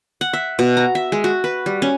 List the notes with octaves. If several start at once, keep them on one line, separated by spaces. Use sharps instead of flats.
F#5
E5
B2
A#5
E5
G#3
F#4
B4
G3
C#4